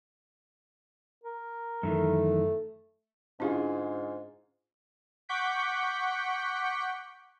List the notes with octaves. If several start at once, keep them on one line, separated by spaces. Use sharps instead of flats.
A#4
F#2 D#3 E3 A3
G#2 D3 C#4 E4 F4 G#4
F#5 C#6 D6 G6 B6